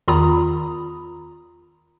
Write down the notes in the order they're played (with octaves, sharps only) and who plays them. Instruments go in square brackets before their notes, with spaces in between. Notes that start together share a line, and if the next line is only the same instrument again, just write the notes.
[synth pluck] E2 D#3 F4 A#5 B5 D#6